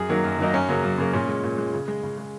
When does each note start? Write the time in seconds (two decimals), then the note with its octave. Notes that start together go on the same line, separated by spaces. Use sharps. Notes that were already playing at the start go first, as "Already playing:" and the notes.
Already playing: F#2 G#4
0.09 D#3 F#3 A#3
0.24 F#2
0.38 D#3 F#3 A#3 D#4
0.54 F#2 C#4
0.69 C#3 F#3 A#3
0.83 F#2
0.98 C#3 F#3 A#3
1.13 A#2 C#4
1.28 G#3
1.43 A#2
1.58 G#3
1.73 C#3
1.88 G#3
2.03 C#3
2.18 G#3